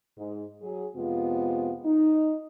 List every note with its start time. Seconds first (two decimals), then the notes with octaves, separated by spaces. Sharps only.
0.17 G#2
0.61 F#3 G#4
0.95 F2 C3 G#3 B3 F4
1.85 D#4